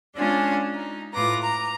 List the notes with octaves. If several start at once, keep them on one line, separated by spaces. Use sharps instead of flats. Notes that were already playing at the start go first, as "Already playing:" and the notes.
G#3 C#4 D4 F4 G#5
D#4
A2 F4 B4 D6 A#6
A#5